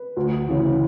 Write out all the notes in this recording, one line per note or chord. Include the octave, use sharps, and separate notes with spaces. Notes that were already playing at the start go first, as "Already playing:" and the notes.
Already playing: B4
D2
C#3 E3